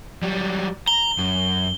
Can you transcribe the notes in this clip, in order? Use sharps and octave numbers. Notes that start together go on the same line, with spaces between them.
F#3 G3
A#5 G7
F#2